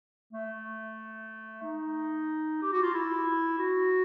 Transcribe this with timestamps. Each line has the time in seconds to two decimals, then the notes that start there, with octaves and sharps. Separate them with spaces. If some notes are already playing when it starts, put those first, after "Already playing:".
0.33 A3
1.63 D#4
2.62 G4
2.73 F#4
2.82 F4
2.94 E4
3.59 F#4